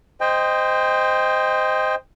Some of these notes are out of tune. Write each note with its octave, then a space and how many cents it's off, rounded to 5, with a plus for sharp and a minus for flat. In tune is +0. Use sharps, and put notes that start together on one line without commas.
C5 -10 D#5 +0 G5 +25